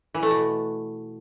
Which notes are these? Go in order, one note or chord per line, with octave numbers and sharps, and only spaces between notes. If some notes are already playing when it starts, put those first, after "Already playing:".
E3
A3
B2